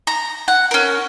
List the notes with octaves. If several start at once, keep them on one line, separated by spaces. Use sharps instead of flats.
A#5
F#5
C#4 A#4